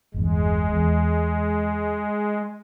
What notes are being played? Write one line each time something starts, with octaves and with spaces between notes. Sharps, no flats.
G1 E2 G#3
E2